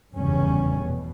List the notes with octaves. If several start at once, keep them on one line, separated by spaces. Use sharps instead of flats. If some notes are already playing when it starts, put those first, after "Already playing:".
F1 E2 G2 C#3 G3 C#4
B2